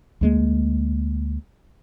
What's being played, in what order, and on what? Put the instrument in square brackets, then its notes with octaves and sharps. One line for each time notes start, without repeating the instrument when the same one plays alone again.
[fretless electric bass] D2 G#3 A#3